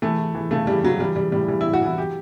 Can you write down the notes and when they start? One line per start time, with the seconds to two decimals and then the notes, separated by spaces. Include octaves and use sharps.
0.02 E3 A3
0.19 E3
0.35 E3
0.51 C#3 A3
0.67 E3 G3
0.83 C#3 F#3
1.00 E3 G3
1.16 E3 G3
1.32 A2 G3
1.48 E3 G3
1.61 E4
1.66 A2
1.73 F#4
1.82 E3 E4
1.97 F#3 G4